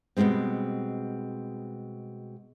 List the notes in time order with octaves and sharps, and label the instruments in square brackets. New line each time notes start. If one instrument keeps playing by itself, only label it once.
[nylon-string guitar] B2 D#3 G3 G#3 C4